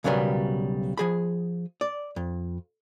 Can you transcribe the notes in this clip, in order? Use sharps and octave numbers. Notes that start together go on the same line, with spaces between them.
B1 C#3 F#3 G3 A#4 B4
F3 G#4 B5
D5
F2